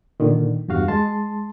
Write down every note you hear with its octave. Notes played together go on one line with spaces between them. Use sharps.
A#2 D3 D#3
E2 G2 F#4 F5
G#3 A5 C6